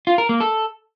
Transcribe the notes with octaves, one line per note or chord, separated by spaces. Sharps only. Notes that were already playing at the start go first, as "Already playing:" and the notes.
F4
A#4
A#3
A4